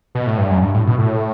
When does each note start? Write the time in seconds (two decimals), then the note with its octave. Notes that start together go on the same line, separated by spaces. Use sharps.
0.15 B2
0.27 A2
0.38 G2
0.50 F#2
0.62 G2
0.74 A2
0.87 B2
0.98 A2